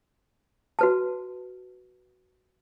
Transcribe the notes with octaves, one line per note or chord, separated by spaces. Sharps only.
F#4 B4 A5